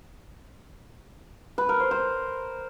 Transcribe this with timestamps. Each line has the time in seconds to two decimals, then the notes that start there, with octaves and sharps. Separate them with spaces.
1.58 B4
1.69 A#4
1.80 C5
1.91 C5